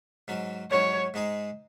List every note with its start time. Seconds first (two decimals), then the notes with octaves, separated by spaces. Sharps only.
0.28 G#2 F#3 C#4
0.71 G#2 F#3 C#4 C#5
1.14 G#2 G#3 D#4 G#4